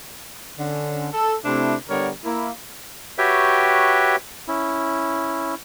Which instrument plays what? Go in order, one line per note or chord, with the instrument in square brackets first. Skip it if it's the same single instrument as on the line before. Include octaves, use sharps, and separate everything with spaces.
[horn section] D3 C#4
A4
C3 A3 C4 D4 E4
D3 G3 B3 A#4 C#5 D5
A#3 E4
[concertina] F#4 G4 B4 C#5 E5 G5
C#4 E4